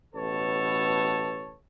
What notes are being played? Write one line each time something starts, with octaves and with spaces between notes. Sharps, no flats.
A1 B2 A4 B4 C#5 A5